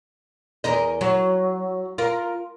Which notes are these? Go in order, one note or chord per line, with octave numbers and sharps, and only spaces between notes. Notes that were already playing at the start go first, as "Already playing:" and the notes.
E2 A#4 D#5
F#3
F4 A#4